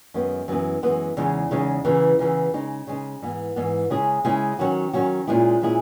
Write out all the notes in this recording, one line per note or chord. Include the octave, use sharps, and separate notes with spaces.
F#2 D#3 G#3 B3
F#2 E3 G#3 B3
F#2 E3 G#3 B3
E2 C#3 G#3 D#4
E2 C#3 G#3 D#4
E2 C#3 E3
E2 C#3 E3
C#3 G#3 D#4
C#3 G#3 D#4
G#2 E3 B3
G#2 E3 B3
C#3 G#3 C#4 E4 G#4
C#3 G#3 C#4 E4 G#4
D#3 F#3 C#4 F#4
D#3 F#3 C#4 F#4
A#2 G#3 C#4 E4 G#4
A#2 G#3 C#4 E4 G#4